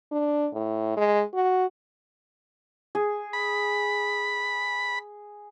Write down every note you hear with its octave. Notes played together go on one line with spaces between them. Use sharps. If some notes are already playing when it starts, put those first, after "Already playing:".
D4
A2
G#3
F#4
G#4
B5